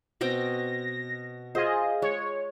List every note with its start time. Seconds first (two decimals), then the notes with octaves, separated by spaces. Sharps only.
0.21 B2 C4 G5 A#6
1.55 F4 G#4 C5 D#5
2.02 G#3 C#5